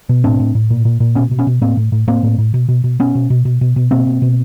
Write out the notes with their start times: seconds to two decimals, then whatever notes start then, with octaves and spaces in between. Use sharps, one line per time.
0.09 B2
0.24 A2 C4 D4
0.40 A2
0.55 A2
0.70 A#2
0.85 A#2
1.00 A#2
1.15 B2 B3 C#4
1.31 B2
1.39 B3 C#4
1.47 B2
1.61 A2 A#3 C4
1.77 A2
1.92 A2
2.07 A2 A#3 C4
2.23 A2
2.38 A2
2.54 B2
2.69 B2
2.84 B2
3.00 B2 B3 C#4
3.15 B2
3.30 B2
3.45 B2
3.61 B2
3.76 B2
3.91 B2 A#3 C4
4.07 B2
4.22 B2